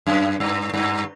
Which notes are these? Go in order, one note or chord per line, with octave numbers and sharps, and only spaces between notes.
F#2
G2
G2